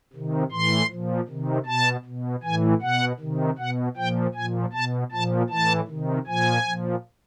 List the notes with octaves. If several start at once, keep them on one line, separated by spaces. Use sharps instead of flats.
C3 D#3
A2 E3 C6
A#2 F3
C3 D#3
B2 A5
B2
A2 E3 G#5
B2 F#5
C3 D#3
B2 F#5
A#2 F3 G5
A#2 F3 G#5
B2 A5
A#2 F3 A5
A2 E3 A5
C3 D#3
A#2 F3 G#5
A#2 F3